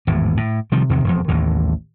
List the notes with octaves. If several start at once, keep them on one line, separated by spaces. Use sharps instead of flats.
G#1 E2 A2
A2
C3 D#3 F3 G3
E2 C3 D#3
E1 F2
A1 D#2 A2